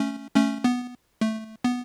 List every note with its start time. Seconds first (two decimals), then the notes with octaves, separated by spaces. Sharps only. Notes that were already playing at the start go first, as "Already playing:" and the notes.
Already playing: A3 C#4
0.36 A3 C#4
0.64 B3
1.21 A3
1.64 B3